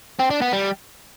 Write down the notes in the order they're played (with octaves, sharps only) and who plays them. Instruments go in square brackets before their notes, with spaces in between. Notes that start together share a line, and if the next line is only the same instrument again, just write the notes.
[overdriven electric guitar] C4
D4
B3
G3